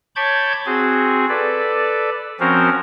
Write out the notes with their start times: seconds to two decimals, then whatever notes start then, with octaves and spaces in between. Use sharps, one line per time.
0.16 C#5 A5 B5 D6 G6 G#6
0.66 C4 F#4 G#4
1.29 A4 B4 D5
2.40 F3 C4 C#4 F#4 A#4 C5